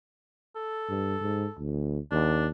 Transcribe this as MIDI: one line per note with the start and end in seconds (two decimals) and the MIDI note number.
0.56 1.63 69
0.90 1.16 43
1.21 1.46 44
1.59 1.99 38
2.11 2.51 39
2.11 2.46 62